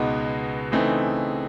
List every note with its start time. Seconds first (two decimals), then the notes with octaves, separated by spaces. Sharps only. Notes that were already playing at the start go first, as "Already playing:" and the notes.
Already playing: C#2 B2 G#3 B3 D#4
0.72 C#3 E3 A3 C4 D#4